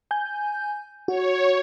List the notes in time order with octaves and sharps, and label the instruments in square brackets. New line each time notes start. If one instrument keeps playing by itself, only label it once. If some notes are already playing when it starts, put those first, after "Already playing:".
[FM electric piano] G#5 G6
[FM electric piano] F#4 [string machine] C#5